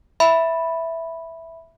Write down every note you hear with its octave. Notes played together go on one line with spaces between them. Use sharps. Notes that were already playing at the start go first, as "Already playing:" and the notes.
E5 B5